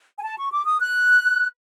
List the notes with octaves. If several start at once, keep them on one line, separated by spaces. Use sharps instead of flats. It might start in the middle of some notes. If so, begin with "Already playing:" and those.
G#5
A5
C#6
D6
D#6
F#6